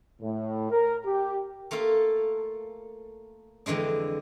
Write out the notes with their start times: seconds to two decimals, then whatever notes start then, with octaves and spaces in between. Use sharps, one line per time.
0.21 A2
0.71 A#4
1.05 G4
1.71 A3 A#3 F4 A4
3.66 F2 D3 E3 G#3 D4